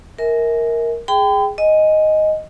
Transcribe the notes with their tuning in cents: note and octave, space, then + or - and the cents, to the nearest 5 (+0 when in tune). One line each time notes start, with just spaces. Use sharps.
A#4 +0 E5 -35 G#5 +10
G#4 +0 G5 +0 B5 +45
D#5 +0 G#5 +0